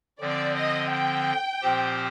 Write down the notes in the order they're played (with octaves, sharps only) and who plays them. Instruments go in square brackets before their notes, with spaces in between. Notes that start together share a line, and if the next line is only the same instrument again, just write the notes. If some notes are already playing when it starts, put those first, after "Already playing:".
[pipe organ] D3 F3 C4 [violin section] D5
[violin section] D#5
G5
[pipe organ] A#2 F3 C4 G4 C5